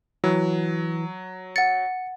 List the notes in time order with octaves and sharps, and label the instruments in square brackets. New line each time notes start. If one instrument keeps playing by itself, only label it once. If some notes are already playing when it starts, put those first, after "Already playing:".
[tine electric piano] E3 [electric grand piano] F#3
[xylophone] F#5 A6 [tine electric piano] C#7